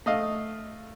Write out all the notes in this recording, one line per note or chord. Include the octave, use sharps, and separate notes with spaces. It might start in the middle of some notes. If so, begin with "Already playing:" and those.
A3 D#5 F5